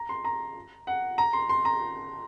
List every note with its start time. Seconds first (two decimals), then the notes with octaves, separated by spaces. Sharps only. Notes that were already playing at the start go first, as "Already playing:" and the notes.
Already playing: A#5
0.09 C6
0.24 A#5
0.87 F#5
1.18 A#5
1.33 C6
1.49 C6
1.65 A#5